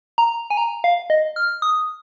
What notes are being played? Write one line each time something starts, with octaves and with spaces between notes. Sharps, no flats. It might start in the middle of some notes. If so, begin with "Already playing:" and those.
A#5
G#5
A#5
F5
D#5
F6
D#6